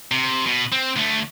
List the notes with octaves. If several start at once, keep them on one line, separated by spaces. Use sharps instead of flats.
C3
B2
C4
D2 A3